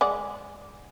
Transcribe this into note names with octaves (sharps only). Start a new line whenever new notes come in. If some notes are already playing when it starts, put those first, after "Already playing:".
G#3 D5 F#5